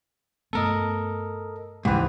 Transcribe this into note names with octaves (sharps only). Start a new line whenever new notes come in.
G2 A3 B3 A4 A#4 D#5
C#2 G#2 C#3 E3 G4 B4